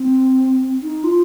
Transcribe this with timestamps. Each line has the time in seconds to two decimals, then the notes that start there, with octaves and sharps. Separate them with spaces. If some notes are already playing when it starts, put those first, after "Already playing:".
Already playing: C4
0.83 D#4
1.04 F4